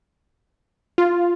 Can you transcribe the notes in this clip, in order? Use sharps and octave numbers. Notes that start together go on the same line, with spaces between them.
F4